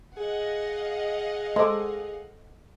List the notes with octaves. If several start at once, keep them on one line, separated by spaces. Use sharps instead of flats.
G#4 D#5 F5 F#5
G#3 A4 C5 D6